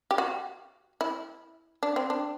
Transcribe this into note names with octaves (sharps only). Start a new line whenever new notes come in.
G4
F#4
E4
D4
C4
D4